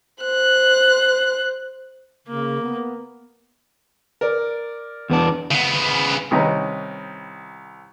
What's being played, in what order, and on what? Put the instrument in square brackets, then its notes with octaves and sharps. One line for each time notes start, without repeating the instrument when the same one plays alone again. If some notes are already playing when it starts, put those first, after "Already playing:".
[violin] C5 F#6
[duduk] C#3 [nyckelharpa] A#3
[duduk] B3
[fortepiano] A#4 D5
[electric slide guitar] E2 B3 D4
[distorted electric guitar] C#3 B3
[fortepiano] C2 D#3 C#4 D#4 B4